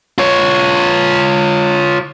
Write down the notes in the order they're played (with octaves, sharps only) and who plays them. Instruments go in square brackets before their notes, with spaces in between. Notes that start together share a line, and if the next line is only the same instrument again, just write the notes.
[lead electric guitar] F4 C#5